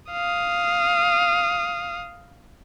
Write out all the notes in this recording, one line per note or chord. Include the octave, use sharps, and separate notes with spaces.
F5 D#6